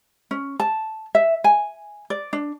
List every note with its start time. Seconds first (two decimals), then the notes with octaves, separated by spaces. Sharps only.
0.31 C#4
0.60 A5
1.15 E5
1.44 G#5
2.10 D5
2.33 D4